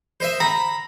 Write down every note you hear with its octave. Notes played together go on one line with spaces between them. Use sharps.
C5 D#5 E5
A#5 B5